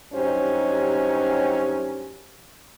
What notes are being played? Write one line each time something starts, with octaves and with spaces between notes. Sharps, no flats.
G2 F#3 C#4 D#4 G4 C5